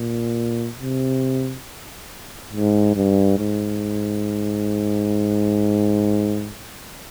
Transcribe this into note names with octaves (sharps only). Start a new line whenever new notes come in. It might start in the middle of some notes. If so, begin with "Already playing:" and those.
Already playing: A#2
C3
G#2
G2
G#2